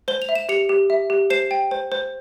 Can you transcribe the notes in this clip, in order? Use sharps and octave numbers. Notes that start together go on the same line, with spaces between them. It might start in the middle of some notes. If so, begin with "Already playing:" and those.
C5 G7
F7
E5
E7
G4 C#7 F7
G4
E5
G4
C5 C7 E7
G5
C5
C5